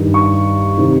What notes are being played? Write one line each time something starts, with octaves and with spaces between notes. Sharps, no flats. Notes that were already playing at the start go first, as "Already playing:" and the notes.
Already playing: G2 D#3
C#6
C3 D#3